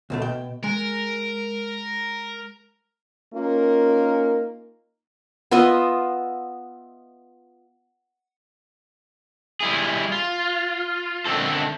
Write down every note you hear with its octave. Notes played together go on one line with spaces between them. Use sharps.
C#2 B2 A3
B2 G5
G#3 A#4
A#3 C#4 D#4 F4 A#4
B3 F4 D#5 E5
G3 E4 G#4
F4
D3 D#3 A3 C4 A4